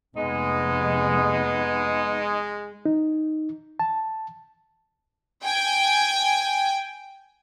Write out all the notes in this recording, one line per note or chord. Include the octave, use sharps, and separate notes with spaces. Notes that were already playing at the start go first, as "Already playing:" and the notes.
F1 G#3 B3 D#4
D#4
A5
G5 G#5